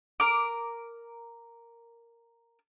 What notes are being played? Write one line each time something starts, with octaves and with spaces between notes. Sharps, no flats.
A#4 D6